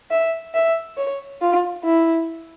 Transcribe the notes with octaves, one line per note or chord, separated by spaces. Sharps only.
E5
E5
C#5
F4
E4